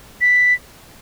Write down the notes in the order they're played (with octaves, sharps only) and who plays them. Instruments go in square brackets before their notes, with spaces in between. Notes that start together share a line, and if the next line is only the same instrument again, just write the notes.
[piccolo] B6